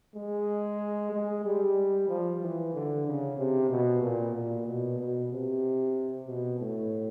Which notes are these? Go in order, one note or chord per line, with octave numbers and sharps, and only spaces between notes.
G#3
G#3
G3
F3
E3
D3
C#3
C3
B2
A#2
A#2
B2
B2
C3
B2
A2